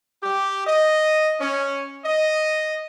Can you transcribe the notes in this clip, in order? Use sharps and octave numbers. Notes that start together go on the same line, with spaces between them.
G4
D#5
C#4
D#5